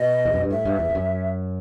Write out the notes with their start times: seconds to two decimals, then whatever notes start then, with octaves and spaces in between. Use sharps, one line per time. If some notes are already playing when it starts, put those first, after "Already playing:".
Already playing: B2 D#5
0.25 E2
0.34 F#2
0.43 G2
0.51 A2 E5
0.65 G2
0.79 E2
0.90 E2
0.95 F#2